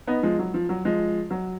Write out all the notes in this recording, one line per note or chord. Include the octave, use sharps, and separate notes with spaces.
B3 D#4
F3 G#3
F#3
F3
F#3
F3 G#3
F#3